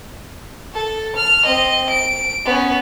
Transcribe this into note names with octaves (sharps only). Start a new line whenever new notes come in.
A4
F6
C4 D#5
D7
B3 C#4